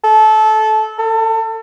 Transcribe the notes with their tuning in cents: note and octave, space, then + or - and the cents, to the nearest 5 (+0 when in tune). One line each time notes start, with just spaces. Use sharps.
A4 -20
A4 +30